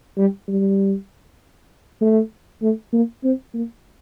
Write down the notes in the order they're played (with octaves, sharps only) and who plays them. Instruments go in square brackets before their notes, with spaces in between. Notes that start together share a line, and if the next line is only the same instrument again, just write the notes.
[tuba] G3
G3
A3
A3
A#3
C4
A#3